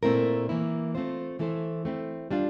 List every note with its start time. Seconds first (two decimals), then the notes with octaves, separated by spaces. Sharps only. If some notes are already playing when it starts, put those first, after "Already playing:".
0.03 A#2 A3 C4 E4 A#4
0.49 E3 A#3 E4
0.95 A3 C4 F4 C5
1.39 E3 A3 E4 A4 C5
1.85 A3 C4 E4
2.31 G3 D4 F4